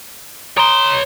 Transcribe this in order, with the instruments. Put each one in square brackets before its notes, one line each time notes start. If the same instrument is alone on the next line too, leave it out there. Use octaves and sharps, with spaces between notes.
[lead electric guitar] C#5 C6 [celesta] A#5 D#6 D7